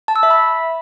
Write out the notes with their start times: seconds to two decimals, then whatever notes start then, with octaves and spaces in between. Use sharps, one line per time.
0.08 A5
0.16 E6
0.23 E5
0.30 B5